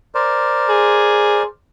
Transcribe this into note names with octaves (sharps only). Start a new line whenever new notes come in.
A#4 C5 D5
G#4